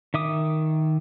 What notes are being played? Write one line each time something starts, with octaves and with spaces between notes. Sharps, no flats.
D#3 E5 D6 D#6